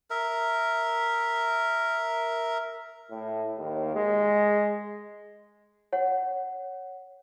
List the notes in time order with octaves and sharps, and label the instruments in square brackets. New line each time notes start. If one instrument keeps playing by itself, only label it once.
[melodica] A#4 E5
[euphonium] A2
D#2
G#3
[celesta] C#5 F#5